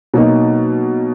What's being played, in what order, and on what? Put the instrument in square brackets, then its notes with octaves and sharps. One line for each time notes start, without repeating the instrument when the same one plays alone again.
[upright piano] B2 F#3 A#3 D#4